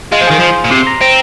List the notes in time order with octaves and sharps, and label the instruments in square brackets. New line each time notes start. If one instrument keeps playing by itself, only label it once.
[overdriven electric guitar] G#3 [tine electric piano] F4
[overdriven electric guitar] F3
[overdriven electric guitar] D#3 [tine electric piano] G#4
[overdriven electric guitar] F3 [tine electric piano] C5
[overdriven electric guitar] A#2
[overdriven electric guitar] C3 [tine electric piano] C6
[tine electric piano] A#5
[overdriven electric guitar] C4 [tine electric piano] A#5